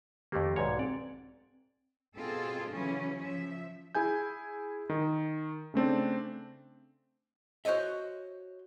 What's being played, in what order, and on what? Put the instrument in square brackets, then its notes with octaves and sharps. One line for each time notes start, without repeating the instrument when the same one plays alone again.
[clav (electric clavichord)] F2 A3 A#3 [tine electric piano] D#3 G4
[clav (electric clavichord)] B1 G#2 C#5 [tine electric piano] D5 G#6
[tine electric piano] C4 [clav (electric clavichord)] D5
[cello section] B2 C4 F4 G#4 A4
C#3 E3 F#3 C#4
F3 E5
[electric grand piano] E4 G#4 G#5 G6
D#3
C#3 A3 C4 D4
[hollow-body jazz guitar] F#4 C5 C#5 D#5 E5